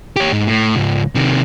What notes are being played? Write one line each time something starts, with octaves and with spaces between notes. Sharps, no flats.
G4 C#5
G#2
A2
C#2 G#2
C3 D#3